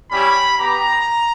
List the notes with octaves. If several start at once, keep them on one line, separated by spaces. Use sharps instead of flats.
G3 C#4 E4 G4 B5
B3 G4 A#5